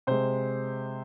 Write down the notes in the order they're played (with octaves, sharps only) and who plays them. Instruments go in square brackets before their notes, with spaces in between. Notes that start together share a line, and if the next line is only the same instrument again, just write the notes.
[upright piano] C3 G#3 C5